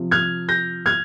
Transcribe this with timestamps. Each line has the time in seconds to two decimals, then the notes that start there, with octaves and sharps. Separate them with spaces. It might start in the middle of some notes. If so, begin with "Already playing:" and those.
Already playing: C3 F3
0.11 F6 G#6
0.49 G6 A#6
0.86 F6 G#6